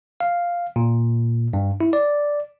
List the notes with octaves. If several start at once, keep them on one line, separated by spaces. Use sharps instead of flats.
F5
A#2
G2
E4
D5